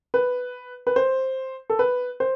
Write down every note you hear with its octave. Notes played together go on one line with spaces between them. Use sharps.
B4
B4
C5
A4
B4
C5